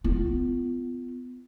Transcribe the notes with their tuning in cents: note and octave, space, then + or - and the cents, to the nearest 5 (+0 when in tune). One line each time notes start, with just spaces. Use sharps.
B3 +30 F4 -20